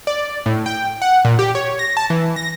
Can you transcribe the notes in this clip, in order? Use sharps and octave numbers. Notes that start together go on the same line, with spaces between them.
D5
A2
G5
F#5
A#2
G4
C#5
A#6
A5
E3
A#6